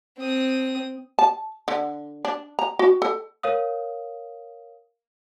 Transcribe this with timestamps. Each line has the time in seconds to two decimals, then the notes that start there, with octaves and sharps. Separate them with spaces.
0.18 C4 D#6
1.19 A5
1.68 D3
2.25 D4
2.59 A#5
2.79 F#4
3.02 A4
3.43 A#4 C#5 F5 D#6